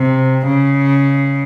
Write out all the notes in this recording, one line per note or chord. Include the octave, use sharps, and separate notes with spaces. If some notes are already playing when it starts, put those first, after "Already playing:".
Already playing: C3
C#3